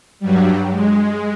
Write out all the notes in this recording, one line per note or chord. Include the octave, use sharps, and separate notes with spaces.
G2 F#3 G3
G#3